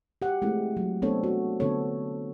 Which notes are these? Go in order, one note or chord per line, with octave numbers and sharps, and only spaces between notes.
G4 F#5
G#3 A3 C4 E4
F#3
A3 B3 C4 D4 A4 C#5
F#4
D3 B3 C4 A4 C#5